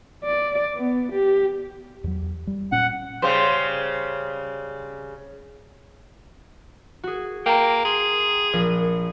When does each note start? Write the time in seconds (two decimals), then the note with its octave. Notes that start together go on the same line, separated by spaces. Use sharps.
0.24 D5
0.76 B3
1.12 G4
2.04 E2 F#3
2.47 G3
2.72 A#2 C#4 F#5
3.22 C#3 G3 C5
7.03 F#4 G#4
7.46 A#3 G5 A#5
7.85 G#4 C6 D7
8.53 A#1